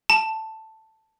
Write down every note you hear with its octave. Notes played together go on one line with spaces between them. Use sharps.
A5